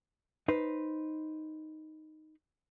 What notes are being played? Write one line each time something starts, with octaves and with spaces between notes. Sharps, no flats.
D#4 B4 C5